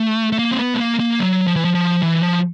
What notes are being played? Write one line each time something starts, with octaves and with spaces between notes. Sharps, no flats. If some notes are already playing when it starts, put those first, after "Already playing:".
Already playing: A3
A3
A#3
C4
B3
A3
A#3
A#3
F#3
F3
E3
F3
F3
E3
F3